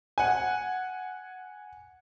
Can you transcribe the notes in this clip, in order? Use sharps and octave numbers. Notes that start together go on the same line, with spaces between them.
F#5 G#5